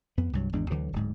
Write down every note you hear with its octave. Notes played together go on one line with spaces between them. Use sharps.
F2 B3
C2 G2 F#3
G#1 E2 G#3 D4
D2 D3 E3 F#3
D1 G#2